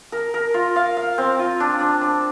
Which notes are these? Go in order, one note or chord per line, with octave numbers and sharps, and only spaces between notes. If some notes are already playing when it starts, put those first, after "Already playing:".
A#4
A#4
F4
F5
F5
C4
F4
D4
D4
D4